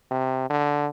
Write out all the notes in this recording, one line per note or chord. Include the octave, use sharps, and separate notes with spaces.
C3
D3